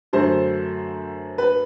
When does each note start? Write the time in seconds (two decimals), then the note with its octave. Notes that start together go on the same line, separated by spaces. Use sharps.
0.13 F#2 D3 F#3 A3 C5
1.38 B4